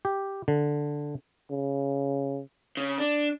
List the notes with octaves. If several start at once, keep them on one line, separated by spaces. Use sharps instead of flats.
G4
D3
C#3
C#3
D4